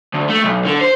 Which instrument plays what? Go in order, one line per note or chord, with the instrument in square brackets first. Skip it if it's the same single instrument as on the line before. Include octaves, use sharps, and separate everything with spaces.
[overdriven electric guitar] D2
A3
B1
D3
C5